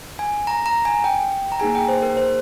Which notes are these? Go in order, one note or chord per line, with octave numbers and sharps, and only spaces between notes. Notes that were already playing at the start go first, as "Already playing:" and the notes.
G#5
A#5
A#5
G#5
G5
A#5
A#3 D#4 G#4 G#5
G5
C5
A#4
C5